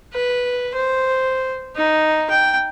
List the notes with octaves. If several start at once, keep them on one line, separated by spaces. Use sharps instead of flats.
B4
C5
D#4
G5